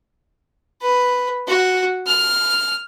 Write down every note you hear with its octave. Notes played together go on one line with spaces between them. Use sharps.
B4
F#4
F6